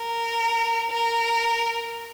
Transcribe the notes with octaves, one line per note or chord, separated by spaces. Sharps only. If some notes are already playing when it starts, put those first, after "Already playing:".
Already playing: A#4
A#4